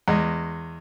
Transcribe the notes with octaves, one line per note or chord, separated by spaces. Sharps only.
E2 G#3